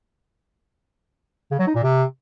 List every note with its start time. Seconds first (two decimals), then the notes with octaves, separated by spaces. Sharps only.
1.51 C#3
1.59 F#3
1.67 D#4
1.75 A#2
1.83 C3